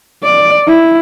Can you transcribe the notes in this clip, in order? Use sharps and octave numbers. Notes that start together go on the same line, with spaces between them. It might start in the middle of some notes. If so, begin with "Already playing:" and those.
D5
E4